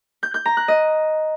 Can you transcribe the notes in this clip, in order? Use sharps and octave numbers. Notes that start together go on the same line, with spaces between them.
G6
G6
A#5
F#6
D#5